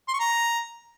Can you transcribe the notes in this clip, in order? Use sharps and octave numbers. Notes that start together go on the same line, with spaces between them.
C6
C#6
A#5